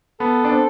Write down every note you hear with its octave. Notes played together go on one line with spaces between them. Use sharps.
B3 A4
D4
C4